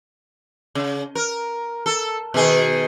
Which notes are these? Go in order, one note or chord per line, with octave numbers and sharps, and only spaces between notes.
C#3
A#4
A4
B2 D#3 G#4